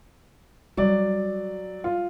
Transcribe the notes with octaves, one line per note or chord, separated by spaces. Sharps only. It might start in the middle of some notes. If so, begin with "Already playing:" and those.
F#3 G3 D5
F4